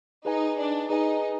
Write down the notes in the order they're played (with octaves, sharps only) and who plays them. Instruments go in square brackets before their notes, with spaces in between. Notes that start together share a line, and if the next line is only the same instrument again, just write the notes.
[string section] D#4 [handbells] G#4 B4 D#5 G#5
[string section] D4
[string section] D#4 [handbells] G#4 B4 D#5 G#5